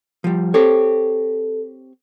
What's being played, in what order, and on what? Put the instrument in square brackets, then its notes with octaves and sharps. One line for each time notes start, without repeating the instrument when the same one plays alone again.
[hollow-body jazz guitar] F3 G3
[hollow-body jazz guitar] C4 G4 C#5 [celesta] A4